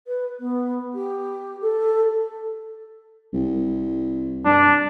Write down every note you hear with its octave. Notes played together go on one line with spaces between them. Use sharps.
B4
B3
G4
A4
C2
G2 D4